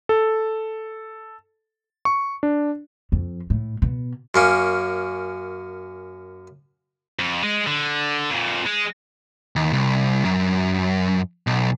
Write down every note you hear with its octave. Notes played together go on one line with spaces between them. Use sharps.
A4
C#6
D4
F2
A2
B2
F#2 A#3 C#4
F2
G#3
D3
F2 A#2
G#3
D#2
C2
F#2
B1